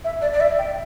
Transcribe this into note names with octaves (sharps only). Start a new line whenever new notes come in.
E5
D5
D5
E5
G5